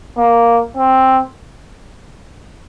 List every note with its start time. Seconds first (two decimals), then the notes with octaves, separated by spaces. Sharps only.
0.18 A#3
0.77 C4